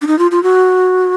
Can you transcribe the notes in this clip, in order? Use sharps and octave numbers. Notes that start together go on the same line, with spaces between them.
D4
D#4
F4
F4
F#4